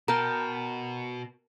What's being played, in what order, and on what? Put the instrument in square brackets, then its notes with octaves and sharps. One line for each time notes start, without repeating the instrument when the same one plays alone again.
[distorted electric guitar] B2 [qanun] A#4 G5 A5 [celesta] A#5